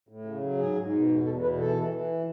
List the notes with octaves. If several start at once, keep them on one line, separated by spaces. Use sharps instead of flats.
A2
C#3
F#3
G#2 G#4
G#2
B2
E2
E2 A4
B2 B4
E3 A4
E3
E3